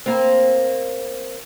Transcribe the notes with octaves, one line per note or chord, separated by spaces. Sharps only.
A#3 C4